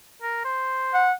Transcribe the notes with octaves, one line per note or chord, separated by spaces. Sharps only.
A#4
C5
F#5